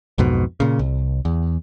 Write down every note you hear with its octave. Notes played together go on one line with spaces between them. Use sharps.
B1 F2 G#2 B2
A#2 C#3
C2
E2